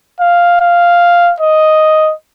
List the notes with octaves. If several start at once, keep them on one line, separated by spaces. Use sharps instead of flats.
F5
F5
D#5